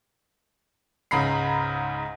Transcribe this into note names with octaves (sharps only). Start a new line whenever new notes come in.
C#2 G#2 C#3 A#5 B5 C7